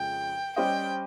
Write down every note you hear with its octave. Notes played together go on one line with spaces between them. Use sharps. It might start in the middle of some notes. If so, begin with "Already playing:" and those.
Already playing: F2 C#3 G#3 G5
G3 C#4 G4 C5 D#5 G5